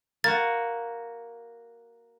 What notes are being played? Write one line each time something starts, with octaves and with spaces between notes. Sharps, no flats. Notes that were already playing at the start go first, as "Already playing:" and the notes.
A#3 F#4 A6